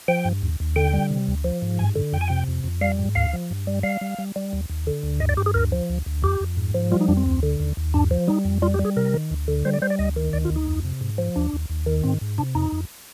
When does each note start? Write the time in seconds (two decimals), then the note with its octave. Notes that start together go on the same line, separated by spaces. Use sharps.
0.08 F3 G5
0.25 G2
0.42 D#2
0.60 D#2
0.76 D3 G5
0.93 G3
1.10 C3
1.28 D2
1.44 F3
1.62 G#2
1.79 G2 G#5
1.96 D3
2.13 F2 G5
2.21 G#5
2.28 C3 G5
2.48 F2
2.64 F2
2.81 G3 F5
2.99 G#2
3.15 D2 F5
3.33 F3
3.50 G2
3.67 G3
3.83 G3 F5
4.01 G3
4.18 G3
4.36 G3
4.53 D#2
4.70 D#2
4.87 D3
5.03 D2
5.20 G2 D#5
5.29 D5
5.37 G2 G4
5.46 G#4
5.54 D2 A#4
5.72 F3
5.90 D2
6.06 D2
6.23 F2 G4
6.40 F2
6.57 G#2
6.74 F3
6.91 G3 F4
7.01 D#4
7.08 F2 D4
7.17 C4
7.26 D2
7.43 D3
7.60 D#2
7.77 D#2
7.94 G2 D4
8.11 F3
8.28 G3 D#4
8.45 F2
8.62 G3 F4
8.74 G4
8.79 G3
8.85 G#4
8.97 C3 A#4
9.14 D#3
9.31 D2
9.48 D3
9.65 G3 C5
9.74 D5
9.82 G3 C5
9.90 D5
9.99 D2 D#5
10.16 D#3
10.33 D2 D5
10.45 F4
10.50 D2
10.56 D#4
10.67 F2
10.85 C3
11.01 G#2
11.18 F3
11.36 D#2 D4
11.53 D#2
11.70 D#2
11.86 D#3
12.04 G#2 C4
12.21 G#2
12.38 C3 D4
12.55 F2 D#4
12.72 F2